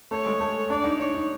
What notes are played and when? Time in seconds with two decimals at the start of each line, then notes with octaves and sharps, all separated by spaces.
0.11 A3 C#5
0.26 G#3
0.41 A3
0.70 D4 D5
0.84 D#4
0.99 D#4 C#5
1.14 D#4